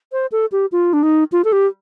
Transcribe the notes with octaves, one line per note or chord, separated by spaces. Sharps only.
C5
A4
G4
F4
D4
D#4
F4
A4
G4